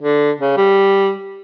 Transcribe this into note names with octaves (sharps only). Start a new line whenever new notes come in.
D3
C#3
G3